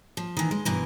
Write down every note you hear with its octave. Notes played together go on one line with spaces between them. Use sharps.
F3
D#3 E3
G#3
G2 B2 E3 A#4